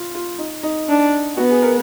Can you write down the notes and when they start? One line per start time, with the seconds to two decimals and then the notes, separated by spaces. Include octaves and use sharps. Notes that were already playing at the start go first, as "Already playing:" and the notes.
Already playing: F4
0.15 F4
0.38 D#4
0.63 D#4
0.89 D4
1.37 B3 F#4
1.50 G#4
1.62 A#4